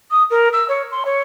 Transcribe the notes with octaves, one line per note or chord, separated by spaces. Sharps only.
D#6
A#4
E6
C#5
C6
C#5